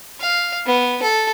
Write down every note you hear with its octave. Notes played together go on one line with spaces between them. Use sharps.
F5
B3
A4